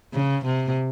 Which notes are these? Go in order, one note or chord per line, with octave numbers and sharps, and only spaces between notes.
C#3
C3